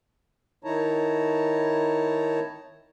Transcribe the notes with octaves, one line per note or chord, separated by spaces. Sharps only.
D#3 D#4 E4 C#5 A5 A#5